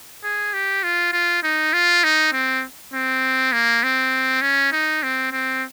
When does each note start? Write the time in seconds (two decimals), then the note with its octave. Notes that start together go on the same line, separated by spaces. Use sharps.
0.24 G#4
0.53 G4
0.83 F4
1.13 F4
1.43 D#4
1.73 F4
2.04 D#4
2.33 C4
2.94 C4
3.53 A#3
3.83 C4
4.42 C#4
4.72 D#4
5.03 C4
5.32 C4